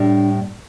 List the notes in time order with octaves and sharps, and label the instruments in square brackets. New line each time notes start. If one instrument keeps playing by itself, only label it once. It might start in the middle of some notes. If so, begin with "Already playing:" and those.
Already playing: [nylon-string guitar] A2 G3 D4